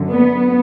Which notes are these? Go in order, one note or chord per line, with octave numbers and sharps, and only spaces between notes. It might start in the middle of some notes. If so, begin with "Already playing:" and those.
Already playing: F#2 D3
B3